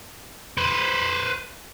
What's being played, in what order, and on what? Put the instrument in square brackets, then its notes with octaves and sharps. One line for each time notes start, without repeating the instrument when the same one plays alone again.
[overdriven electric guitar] B4 C5